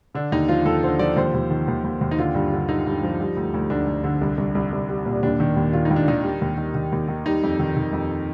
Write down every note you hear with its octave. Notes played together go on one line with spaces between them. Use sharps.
D3 D4
D#2 D#4
F3 F4
D#2 A4
D3 C5
F3 D5
D#2 C5
D#2
D#3
D#2
D#2
D#2
D#4
D3 F4
G2
D3
D3 D#4
G2
F3
G3
D2
D2
D2 D4
D2
D3
C2
C2
C2
C2
G3
A#2
D#2 D4
D#3
D#2
D#3 F4
D#4
D#2
D4
D#3 D#4
G3
D#2
D#3
D#3
D#2
D#3
G3 D#4
F2
D#3
D#3
F2